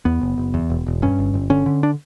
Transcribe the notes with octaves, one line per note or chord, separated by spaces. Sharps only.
E2 B3
F#1
F#1
E2
E1
E1
G2 C#4
G1
G1
D3 C#4
D3
D4